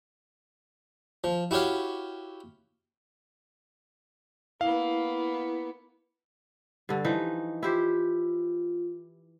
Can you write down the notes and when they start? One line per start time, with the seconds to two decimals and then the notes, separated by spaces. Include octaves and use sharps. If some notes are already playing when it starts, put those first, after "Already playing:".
1.24 F3
1.51 E4 F#4 G4 C#5 F5
4.61 A#3 B3 E4 F5
6.89 G2 D3
7.05 E3 F3 D#4
7.63 E4 F4 G4 C5